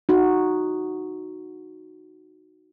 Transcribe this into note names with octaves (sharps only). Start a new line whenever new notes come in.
D#4 F#4